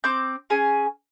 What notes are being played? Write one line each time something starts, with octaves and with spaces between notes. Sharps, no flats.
C4 D6 G6
C#4 G#4 G#5